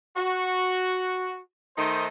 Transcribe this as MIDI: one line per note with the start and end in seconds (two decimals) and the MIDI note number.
0.17 1.40 66
1.77 2.07 51
1.77 2.07 57
1.77 2.07 63
1.77 2.07 72